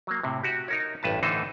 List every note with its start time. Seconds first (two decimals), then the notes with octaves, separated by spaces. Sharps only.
0.07 F#3 A#3
0.23 A2 C3
0.43 F#4 G4
0.68 D#4 A#4 C#5
1.03 A1 G2 B4 A5
1.23 A2 D3 E3 D#4 A4 C5